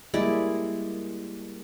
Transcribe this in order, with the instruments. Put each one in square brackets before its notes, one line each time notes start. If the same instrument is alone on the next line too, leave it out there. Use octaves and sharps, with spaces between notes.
[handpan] G3 A#3 [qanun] G#3 E4 D5